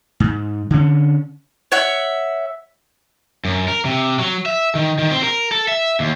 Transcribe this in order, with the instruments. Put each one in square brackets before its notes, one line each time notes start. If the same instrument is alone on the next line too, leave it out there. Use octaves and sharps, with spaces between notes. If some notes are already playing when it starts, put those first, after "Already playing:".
[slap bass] G#2
D3 C#4
[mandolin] C#5 E5 F#5
[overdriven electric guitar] F#2
A#4
C3
F#3
E5
D#3
D#3
C4
A#4
A4
E5
D#2